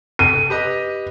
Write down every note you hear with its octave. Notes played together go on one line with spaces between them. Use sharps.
F1 A4 D#7
G4 B4 D#5